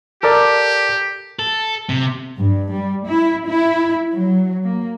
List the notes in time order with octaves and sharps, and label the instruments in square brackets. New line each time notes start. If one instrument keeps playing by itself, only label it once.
[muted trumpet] G4 [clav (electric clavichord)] A4 A#4 D5
[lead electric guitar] A4
C3
[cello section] G2
G3
E4
E4
F#3
A#3